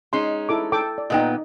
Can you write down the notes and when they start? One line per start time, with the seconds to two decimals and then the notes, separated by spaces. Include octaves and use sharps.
0.13 G#3 C#4 D#4 C6
0.49 E4 A4 D6
0.72 A4 G5 D6
0.98 D5
1.10 A#2 B3 D#4 D#5 G5